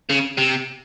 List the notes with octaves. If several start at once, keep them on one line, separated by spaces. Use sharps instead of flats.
C#3
C3